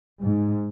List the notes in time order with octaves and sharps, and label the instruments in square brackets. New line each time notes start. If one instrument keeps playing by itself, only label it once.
[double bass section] G#2